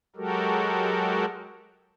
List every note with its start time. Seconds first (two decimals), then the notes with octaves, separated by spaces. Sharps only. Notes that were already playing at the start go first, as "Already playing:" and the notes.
0.16 F#3 G#3 F#4 G4 A4 A#4